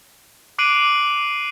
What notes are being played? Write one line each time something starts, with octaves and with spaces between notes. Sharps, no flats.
D6 F#6 C7 D7 D#7 F#7